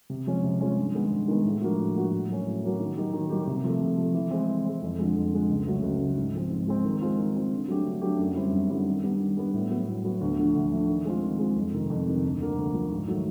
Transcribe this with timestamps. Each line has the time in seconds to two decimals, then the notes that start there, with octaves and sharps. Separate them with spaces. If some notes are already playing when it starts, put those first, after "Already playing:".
0.10 C3
0.27 F3 G#3 C#4
0.44 C3
0.60 F3 G#3 C#4
0.77 G2
0.94 D#3 G#3 B3
1.12 G2
1.28 D#3 G#3 B3
1.45 A2
1.61 F3 A#3 D4 F#4
1.79 A2
1.96 F3 A#3 D4 F#4
2.12 A2
2.29 F#3 A#3 C#4
2.46 A2
2.63 F#3 A#3 C#4
2.80 D#3
2.97 F#3 A#3 D#4 G4
3.13 D#3
3.30 F#3 A#3 D#4 G4
3.47 C3
3.64 F3 A3
3.81 C3
3.97 F3
4.02 A3
4.14 E3
4.31 G#3 C4
4.48 E3
4.65 G#3 C4
4.82 F2
4.99 D3 F3 G#3
5.15 F2
5.33 D3 F3 G#3
5.49 C#2
5.66 C#3 F#3 A3
5.83 C#2
6.00 C#3 F#3 A3
6.17 G#2
6.34 F3 G#3 C4
6.51 G#2
6.67 F3 G#3 C4
6.84 D#3
7.01 G#3 C4 F4
7.18 D#3
7.35 G#3 C4 F4
7.51 D3
7.68 F#3 A3 D4 G4
7.85 D3
8.02 F#3 A3 D4 G4
8.19 F#2
8.36 D3 G3 C4 E4
8.53 F#2
8.70 D3 G3 C4 E4
8.86 D#3
9.03 G3 B3 D4
9.20 D#3
9.37 G3 B3 D4
9.54 A2
9.71 F#3 B3
9.88 A2
10.05 F#3 B3
10.21 D2
10.38 D3 F3 A3 D4
10.55 D2
10.72 D3 F3 A3 D4
10.89 D#3
11.05 G#3 C4 F4
11.23 D#3
11.39 G#3 C4 F4
11.56 F2
11.73 C3 D#3
11.90 F2
12.07 C3 D#3
12.24 D2
12.40 D3 F3 A#3 D4
12.57 D2
12.74 D3 F3 A#3 D4
12.91 G#2
13.08 D#3 F#3 A3